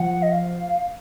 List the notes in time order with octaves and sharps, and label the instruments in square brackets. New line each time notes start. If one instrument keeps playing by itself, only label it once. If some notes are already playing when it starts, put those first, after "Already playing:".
Already playing: [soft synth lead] F3 [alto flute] F#5
[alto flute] D#5
F5